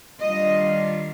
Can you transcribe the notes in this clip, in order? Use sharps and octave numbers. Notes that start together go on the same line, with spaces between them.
D#3 G3 D4 F4 D#5